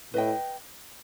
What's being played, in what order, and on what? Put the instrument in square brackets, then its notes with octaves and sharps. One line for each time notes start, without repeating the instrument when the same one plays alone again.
[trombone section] A2 [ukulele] B4 D#5 G5